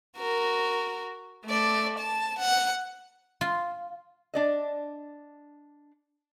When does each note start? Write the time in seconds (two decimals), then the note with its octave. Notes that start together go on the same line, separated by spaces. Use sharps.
0.18 F#4 A#4
1.45 A3 D5
1.99 A5
2.39 F#5
3.41 F4
4.34 D4 D5 D#5